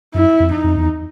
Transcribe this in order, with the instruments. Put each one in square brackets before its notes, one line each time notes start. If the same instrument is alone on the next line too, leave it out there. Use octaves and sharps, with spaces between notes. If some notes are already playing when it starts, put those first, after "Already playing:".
[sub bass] F#2 [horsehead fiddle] E4
[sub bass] F2
[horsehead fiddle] D#4
[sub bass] F2
E2